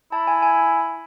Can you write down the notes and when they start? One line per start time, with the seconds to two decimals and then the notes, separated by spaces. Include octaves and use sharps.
0.12 E4 A5
0.27 G#5
0.42 G#5